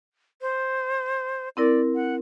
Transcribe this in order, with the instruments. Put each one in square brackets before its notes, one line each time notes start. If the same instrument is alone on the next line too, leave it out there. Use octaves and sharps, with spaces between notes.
[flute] C5
[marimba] C4 E4 A#4 [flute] D5
[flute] F#5